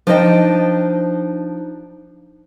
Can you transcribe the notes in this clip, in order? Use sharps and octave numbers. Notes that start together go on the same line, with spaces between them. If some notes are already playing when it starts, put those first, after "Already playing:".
F3 D4 D#4 C5 D#5 G5